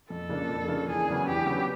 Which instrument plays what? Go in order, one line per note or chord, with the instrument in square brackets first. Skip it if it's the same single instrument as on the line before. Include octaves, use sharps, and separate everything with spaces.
[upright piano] F2 [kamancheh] A4
[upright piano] C#3 F3 A#3 D4
F2
C#3 F3 A#3 D4
[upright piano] E2 [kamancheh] G#4
[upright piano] C#3 F#3 B3 D4
[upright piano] E2 [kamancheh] G4
[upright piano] C#3 F#3 B3 D4